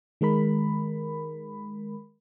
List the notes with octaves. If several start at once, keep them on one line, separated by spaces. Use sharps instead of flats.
D#3 G#3 A#4 B5